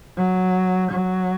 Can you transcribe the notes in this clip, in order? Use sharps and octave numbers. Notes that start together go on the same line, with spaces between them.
F#3
F#3